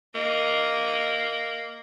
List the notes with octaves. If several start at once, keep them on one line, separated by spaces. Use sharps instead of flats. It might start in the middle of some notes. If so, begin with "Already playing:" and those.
A#3 D#5